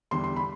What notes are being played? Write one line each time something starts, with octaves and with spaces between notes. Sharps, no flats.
E2 D3 G3 C6
C6
B5